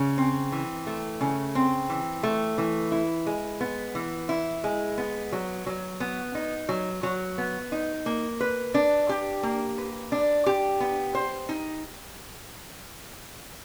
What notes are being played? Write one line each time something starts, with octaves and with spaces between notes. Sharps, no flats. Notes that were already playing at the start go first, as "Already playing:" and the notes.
Already playing: C#3
C4
E3
A3
C#3
C4
E3
A3
E3
E4
G#3
B3
E3
E4
G#3
B3
F#3
F#3
B3
D#4
F#3
F#3
B3
D#4
A#3
B4
D4
G4
A#3
B4
D4
G4
B3
C5
D#4